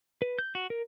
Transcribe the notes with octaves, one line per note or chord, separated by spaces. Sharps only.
B4
G6
F#4
A#4